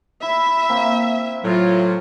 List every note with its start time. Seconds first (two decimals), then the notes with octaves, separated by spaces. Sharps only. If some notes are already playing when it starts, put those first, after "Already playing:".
0.22 E4 E5
0.69 A#3 C4
1.44 A2 F#3 F4